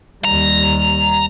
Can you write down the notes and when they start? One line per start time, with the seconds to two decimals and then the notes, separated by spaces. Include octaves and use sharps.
0.25 D#2 G3 A#5